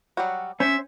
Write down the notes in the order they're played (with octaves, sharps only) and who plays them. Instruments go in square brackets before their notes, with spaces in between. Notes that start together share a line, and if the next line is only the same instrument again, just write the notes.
[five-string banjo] F#3 G3 F#4
[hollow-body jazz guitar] C#4 [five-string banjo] C5 [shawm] E5